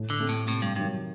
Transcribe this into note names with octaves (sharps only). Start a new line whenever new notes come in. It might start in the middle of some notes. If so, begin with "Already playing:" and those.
Already playing: A2
D3
A3 C4
A2
A2 C3
G2
G2 D#3 F#3